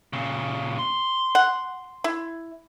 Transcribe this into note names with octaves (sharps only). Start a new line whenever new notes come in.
A#2 C#3
C6
F#5
E4